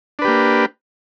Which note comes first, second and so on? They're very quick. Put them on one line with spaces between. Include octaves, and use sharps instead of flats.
D4 B4 G4 A#3